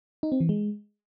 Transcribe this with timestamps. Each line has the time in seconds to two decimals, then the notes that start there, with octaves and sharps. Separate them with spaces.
0.23 D#4
0.32 C4
0.40 E3
0.49 G#3